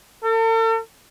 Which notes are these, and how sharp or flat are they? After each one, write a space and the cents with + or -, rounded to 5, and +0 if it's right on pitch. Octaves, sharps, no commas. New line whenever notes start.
A4 +45